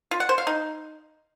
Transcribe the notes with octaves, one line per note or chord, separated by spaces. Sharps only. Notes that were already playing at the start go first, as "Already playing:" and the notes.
F4
F#5
C5
F5
D#4